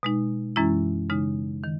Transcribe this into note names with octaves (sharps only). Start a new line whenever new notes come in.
B2 G#3 D#4
F#2 E3 G#3 C#4 E4
C#3 G#3 D#4
D#3